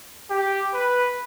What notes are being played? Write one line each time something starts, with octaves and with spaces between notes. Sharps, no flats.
G4
B4